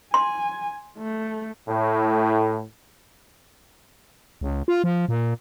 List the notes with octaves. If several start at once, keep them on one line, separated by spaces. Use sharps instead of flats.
G#5 C6
A3
A2
C#2
F4
F3
A#2